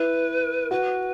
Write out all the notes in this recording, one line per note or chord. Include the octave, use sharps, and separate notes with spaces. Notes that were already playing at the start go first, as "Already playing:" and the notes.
Already playing: E4 B4
F#4 B4